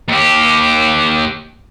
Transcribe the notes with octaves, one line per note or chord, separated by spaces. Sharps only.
D#2 G4